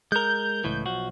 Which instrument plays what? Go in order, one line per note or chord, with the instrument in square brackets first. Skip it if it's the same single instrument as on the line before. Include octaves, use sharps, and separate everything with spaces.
[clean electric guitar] G#3 A#4 [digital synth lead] G6
[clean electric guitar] C#2 A2 E3
B1 F3 F#4